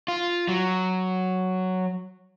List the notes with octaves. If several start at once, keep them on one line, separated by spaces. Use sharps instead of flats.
F4
F#3